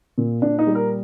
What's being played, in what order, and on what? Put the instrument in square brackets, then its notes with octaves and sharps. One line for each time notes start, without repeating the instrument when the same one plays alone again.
[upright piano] A#2
A#2 D4
D#4
G3
A#4